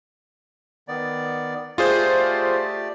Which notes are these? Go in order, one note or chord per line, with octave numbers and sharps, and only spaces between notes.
D#3 B3 D5
A3 F4 G4 G#4 C5 D5